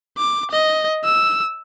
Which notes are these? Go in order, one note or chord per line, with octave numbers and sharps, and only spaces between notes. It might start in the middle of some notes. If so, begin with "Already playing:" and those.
D6
D#5
E6